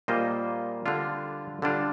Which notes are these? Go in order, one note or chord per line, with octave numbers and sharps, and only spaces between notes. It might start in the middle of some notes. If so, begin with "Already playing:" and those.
A#2 G3 A#3 F4 C5 D#5
D3 G3 D4 F4
D3 G3 D4 F4